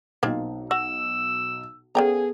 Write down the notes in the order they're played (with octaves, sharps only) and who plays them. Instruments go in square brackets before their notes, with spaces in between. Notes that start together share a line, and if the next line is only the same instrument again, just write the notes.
[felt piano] B1 D#4 [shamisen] F3 A#3 C4
[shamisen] F#4 [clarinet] E6
[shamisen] C#3 G5 A#5 [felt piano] B3 A4 [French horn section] G#4